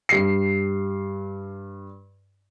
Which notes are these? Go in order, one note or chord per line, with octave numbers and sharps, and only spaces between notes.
G2 C7